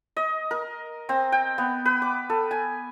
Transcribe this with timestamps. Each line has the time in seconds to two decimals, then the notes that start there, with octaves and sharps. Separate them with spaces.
0.17 D#5
0.51 A#4
1.09 C4
1.32 G5
1.58 B3
1.85 B4
2.02 D6
2.30 A4
2.51 G#5